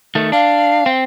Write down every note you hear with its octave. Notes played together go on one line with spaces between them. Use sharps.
D#3 A3
D4 F5
C4